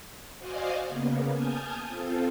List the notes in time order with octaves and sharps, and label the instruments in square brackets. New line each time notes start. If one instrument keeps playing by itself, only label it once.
[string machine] F#4 C5 D5 D#5 F5 G#5
C#3 A#3 B3
G#5 A5 D#6 F6 G6 G#6
C4 F4 A4